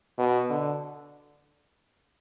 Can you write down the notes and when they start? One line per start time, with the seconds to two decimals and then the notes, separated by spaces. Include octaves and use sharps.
0.19 B2
0.50 D3